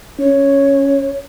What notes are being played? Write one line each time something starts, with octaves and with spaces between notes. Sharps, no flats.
C#4 C#5